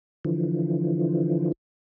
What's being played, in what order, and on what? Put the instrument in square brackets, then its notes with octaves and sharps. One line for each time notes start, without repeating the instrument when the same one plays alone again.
[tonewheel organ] D3 E3 F3